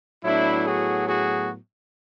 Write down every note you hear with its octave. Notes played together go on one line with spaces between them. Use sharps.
A2 F#3 B3 D4 E4
F#4 G#4
F#4 G#4